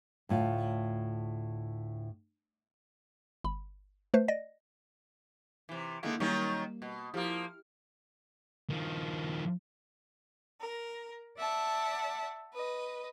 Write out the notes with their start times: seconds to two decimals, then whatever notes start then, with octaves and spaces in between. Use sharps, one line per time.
0.29 D2 A2 F4
3.44 G1 B5
4.14 A3 B4 C5
4.28 D5 D#5 A#6
5.69 C3 E3
6.03 D3 D#3 G#3 A#3 E4 F5
6.20 D#3 F#3 G3 A#3 C#4
6.82 B2
7.14 F3 A#3 E4 G4 F6
8.70 D#3 F3
10.61 A#4
11.38 D5 E5 F#5 A5
12.53 B4 D#5